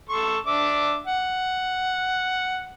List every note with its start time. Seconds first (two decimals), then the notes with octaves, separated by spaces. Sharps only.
0.09 A4 C6 C#6
0.47 D4 E5 D6
1.07 F#5